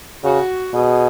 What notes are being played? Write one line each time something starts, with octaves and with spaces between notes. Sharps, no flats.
C#3 F#4
B2 G#4